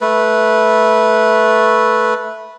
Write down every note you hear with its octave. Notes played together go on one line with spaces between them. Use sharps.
A3 B4